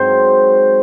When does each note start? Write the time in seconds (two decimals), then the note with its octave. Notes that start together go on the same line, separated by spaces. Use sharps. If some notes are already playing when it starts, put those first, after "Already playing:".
Already playing: G#2 F#3 C4 C5